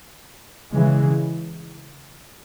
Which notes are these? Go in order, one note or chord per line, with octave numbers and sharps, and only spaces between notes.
C#3 E3 G#3